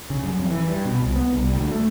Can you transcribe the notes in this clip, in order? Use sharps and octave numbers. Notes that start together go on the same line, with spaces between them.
C#3
F#2
F2
E3
G2
B2
C2
B3
C2
D2
A3